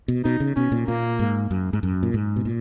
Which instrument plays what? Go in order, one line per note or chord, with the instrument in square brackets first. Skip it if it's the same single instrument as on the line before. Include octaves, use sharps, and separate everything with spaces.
[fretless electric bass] B2
[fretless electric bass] B2 [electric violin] D#4
[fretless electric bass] C#3
[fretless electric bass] B2 [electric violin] C#4
[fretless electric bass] A#2
[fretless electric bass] A#2 [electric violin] A#3
[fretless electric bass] G#2
F#2
G#2
F#2
A#2
G#2
B2
A#2